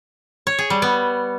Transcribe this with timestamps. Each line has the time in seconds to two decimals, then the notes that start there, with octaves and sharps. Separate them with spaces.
0.47 C#5
0.59 G#4
0.70 G3
0.82 B3